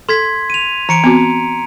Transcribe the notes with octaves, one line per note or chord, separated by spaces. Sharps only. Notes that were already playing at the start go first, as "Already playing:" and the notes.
A4 C6 G#6 B6
D#7 F7
E3 A#5 C#7 D7
B3 C4 F#4